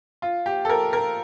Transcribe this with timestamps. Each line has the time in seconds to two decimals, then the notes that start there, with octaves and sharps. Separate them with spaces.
0.22 F4
0.46 G4
0.65 A4
0.69 A#4
0.93 A#4